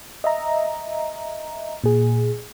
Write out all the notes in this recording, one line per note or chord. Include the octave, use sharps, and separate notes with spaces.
D#5 E5 A#5
A#2 G#4